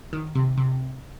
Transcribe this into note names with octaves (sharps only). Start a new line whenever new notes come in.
D#3
C3
C3